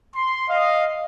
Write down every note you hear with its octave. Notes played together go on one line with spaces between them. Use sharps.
C6
D#5 F5